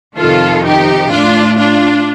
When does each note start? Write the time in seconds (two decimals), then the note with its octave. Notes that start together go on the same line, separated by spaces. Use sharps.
0.18 F2 C3 D#3 F4 A4
0.65 D#4 G4
1.10 A2 D4 F4
1.57 D4 F4